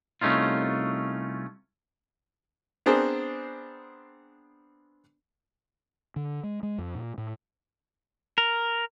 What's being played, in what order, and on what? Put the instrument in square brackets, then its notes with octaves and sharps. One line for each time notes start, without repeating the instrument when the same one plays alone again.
[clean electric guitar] C2 A3 C#4 D#4 F4
[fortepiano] B3 C4 D4 G#4 A#4 C5
[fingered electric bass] D3
G#3
G#3
F2
A#2
A2
[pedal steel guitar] A#4